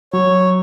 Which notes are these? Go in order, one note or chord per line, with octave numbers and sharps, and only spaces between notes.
F#3 C#5